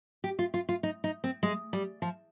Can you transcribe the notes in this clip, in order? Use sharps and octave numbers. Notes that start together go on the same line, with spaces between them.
G4
F4
F4
F4
D#4
D#4
C4
G#3
G3
F3